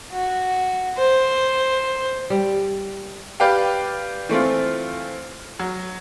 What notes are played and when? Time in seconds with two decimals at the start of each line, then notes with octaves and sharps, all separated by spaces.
0.11 F#4
0.98 C5
2.30 G3
3.40 G4 B4 D5 F5 G5
4.29 E3 A3 C4 F4
5.59 F#3